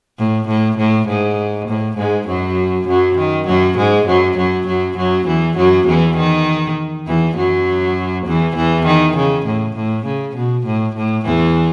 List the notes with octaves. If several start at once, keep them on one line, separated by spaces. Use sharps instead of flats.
A2
A2
A2
G#2
A2
G#2 G#3
F#2 F#3
F#2 F#3
D#3
F#2 F#3
G#2 G#3
F#2 F#3
F#2 F#3
F#2 F#3
F#2 F#3
E2 E3
F#2 F#3
E2 E3
D#3
E2 E3
F#2 F#3
E2 E3
E2 E3
D#3
C#3
A2
A2
C#3
B2
A2
A2
E2 E3